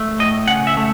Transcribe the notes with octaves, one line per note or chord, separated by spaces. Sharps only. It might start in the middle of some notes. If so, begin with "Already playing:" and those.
Already playing: A3
A2 D#5
C#3 F#5
E5
A3